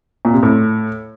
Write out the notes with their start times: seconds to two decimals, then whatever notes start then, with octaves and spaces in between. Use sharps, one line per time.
0.25 A#2
0.34 C3
0.43 A2